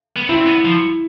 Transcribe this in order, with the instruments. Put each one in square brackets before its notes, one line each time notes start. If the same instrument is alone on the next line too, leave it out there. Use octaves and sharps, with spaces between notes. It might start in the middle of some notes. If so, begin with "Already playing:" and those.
[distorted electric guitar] B3
[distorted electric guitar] C4 [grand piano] E4
[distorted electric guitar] B3
F3